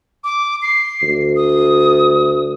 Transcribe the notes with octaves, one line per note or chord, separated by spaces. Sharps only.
D6
C7
D2
D#6